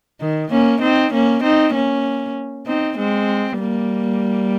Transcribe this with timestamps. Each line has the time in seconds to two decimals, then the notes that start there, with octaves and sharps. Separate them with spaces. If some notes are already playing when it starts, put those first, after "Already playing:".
0.21 D#3
0.51 A#3 C#4
0.81 C4 D#4
1.13 A#3 C#4
1.43 C4 D#4
1.74 A#3 C#4
2.66 C4 D#4
2.98 G#3 C4
3.59 G3 A#3